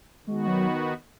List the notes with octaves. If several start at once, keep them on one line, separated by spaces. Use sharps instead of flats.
D#3 G#3 B3 F#4
F#3